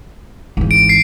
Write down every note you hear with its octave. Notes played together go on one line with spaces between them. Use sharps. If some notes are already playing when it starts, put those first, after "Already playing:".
G#1 E3
D7
C7